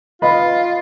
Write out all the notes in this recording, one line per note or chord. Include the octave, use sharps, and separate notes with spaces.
F4 B4 D#5 B5